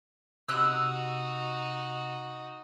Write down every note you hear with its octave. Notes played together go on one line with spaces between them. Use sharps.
C3 D#4 F#4 E6 F#6